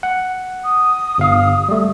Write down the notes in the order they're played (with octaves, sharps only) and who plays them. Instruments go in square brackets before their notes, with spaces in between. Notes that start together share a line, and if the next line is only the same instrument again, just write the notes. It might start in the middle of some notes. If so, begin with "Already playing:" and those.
[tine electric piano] F#5
[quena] D#6
[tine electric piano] G1 F5
G3 A3